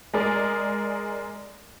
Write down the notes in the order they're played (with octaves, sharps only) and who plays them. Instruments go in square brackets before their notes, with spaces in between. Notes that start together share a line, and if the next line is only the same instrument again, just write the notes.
[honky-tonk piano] G#3 G#4 A#4 D5